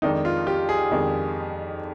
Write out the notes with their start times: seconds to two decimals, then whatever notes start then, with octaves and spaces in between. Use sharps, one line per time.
0.02 F2 D#3 G#3 D4 D#4
0.25 F4
0.47 G4
0.69 G#4
0.91 F2 D#3 G#3 D4